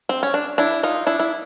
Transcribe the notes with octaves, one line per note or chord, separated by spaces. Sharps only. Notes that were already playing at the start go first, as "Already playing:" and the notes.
C4
C#4
D4
D4 E4
D#4 F4
D4 E4
E4